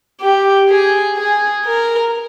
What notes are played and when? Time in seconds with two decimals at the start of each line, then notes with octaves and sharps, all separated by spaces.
0.21 G4
0.69 G#4
1.17 G#4
1.65 A#4